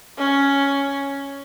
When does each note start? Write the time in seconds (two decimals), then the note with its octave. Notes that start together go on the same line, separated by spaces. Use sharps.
0.18 C#4